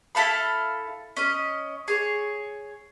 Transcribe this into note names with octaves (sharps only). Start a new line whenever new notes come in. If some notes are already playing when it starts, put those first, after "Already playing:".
E4 A4 F5 B5
C#4 D#5
G#4 C#5